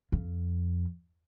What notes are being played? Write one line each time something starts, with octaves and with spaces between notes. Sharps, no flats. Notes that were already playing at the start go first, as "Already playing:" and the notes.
F2